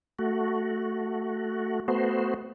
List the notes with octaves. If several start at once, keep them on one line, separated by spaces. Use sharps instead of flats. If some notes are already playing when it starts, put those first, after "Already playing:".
A3 F#4
A3 B3 F#4 C5